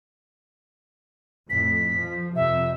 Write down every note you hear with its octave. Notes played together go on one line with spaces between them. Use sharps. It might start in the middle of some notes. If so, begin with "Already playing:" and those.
F2 A2 B6
F3
F2 C3 E5